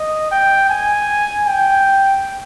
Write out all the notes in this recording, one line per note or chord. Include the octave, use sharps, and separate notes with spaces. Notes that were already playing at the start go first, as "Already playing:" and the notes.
Already playing: D#5
G5
G#5
G5